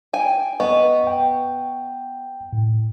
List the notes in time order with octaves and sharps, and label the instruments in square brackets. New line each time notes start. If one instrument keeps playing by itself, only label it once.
[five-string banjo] G5 G#5
[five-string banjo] B3 [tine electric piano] D#5 C#6
[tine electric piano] G5
A2